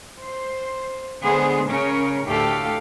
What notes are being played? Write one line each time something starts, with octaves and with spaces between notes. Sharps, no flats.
C5
D3 G#3 B3 G#4 C5
C#3 C#4 A#4 C#5
D2 A2 A3 G4 A4 F5